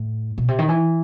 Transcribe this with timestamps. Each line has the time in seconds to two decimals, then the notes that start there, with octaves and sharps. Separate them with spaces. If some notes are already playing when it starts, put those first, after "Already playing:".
Already playing: A2
0.38 B2
0.48 C3
0.59 D#3
0.69 E3